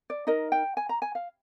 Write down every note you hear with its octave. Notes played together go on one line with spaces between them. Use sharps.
D5
D#4 A#4 D#5
G5
G#5
A#5
G#5
F5